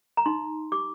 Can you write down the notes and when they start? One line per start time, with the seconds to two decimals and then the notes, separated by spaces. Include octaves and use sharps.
0.17 A#5
0.26 D#4 C6
0.72 G4 D6